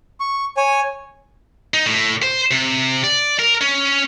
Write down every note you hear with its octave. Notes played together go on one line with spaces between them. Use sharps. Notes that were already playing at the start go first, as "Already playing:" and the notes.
C#6
C#5 G#5
D#4
A2
C5
C3
D5
A#4
C#4